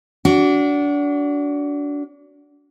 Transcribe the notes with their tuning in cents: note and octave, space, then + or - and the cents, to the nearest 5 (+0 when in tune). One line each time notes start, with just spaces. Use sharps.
D4 -25 F#4 +10